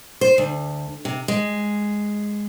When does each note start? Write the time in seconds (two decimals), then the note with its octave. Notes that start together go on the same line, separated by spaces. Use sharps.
0.21 C5
0.38 D2
1.05 C3
1.28 G#3